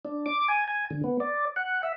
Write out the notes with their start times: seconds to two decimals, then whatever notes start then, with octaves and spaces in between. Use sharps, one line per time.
0.05 D4
0.26 D6
0.48 G#5
0.68 G#5
0.90 D3
1.04 B3
1.20 D5
1.56 F#5
1.83 E5